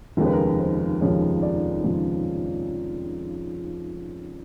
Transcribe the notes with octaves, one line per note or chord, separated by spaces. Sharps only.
F1 D#2 C#3 F3 G#3 A#4
B4
A#4
C5
F1 D#2 C#3 F3 G#3 C#5
D5
F1 D#2 C#3 F3 G#3